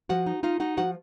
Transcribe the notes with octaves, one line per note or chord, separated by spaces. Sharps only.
F3 F#4 F#5
D#4
D#4 F4 F5
D#4 F#4 F#5
F3 F#4 F#5